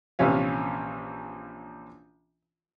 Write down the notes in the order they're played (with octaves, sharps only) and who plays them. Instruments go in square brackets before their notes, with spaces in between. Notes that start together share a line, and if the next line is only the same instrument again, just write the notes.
[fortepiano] A#1 C3 E3 C#4 F5